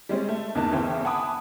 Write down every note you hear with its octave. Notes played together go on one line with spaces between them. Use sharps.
G3 G#3 C4 C#4
A3
E2 C3 A#3 D#4 A5 F#6
G1 C#3 E3 C4 E5 G5
F#5 G#5 A5 B5 D6 D#6